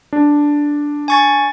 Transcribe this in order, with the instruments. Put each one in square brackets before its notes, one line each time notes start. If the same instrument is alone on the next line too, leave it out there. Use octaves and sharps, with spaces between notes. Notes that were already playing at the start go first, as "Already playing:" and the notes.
[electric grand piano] D4
[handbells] G#5 C#6 A6